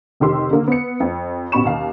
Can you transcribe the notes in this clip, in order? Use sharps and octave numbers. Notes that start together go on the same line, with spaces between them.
F1 D#3 G4 C6 E6
D3 A#3
B3 C#7
F2
A1 B2 B5 C#6 E7
D#2 F5